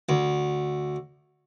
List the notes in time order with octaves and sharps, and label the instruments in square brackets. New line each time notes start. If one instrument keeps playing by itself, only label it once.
[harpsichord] D2